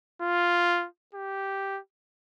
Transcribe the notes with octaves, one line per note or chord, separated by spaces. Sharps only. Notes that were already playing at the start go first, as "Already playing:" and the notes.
F4
G4